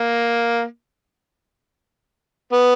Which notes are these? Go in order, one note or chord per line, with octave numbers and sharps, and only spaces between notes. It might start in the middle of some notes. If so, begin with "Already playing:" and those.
Already playing: A#3
B3